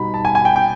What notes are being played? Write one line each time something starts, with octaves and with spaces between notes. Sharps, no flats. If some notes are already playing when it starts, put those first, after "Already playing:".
Already playing: B2 G3 B3 D#4 B5
A5
G#5
G#5
G5
G5